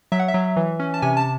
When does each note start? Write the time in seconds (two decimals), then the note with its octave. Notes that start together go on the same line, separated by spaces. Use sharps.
0.12 F#3 E5
0.19 F#5
0.28 E5
0.34 F#3
0.56 E3
0.80 C#4
0.94 A5
1.02 C3 G#5
1.17 A5